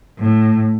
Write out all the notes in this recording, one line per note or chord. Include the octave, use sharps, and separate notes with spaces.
A2